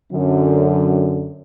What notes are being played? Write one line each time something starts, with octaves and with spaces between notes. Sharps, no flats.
F#2 D3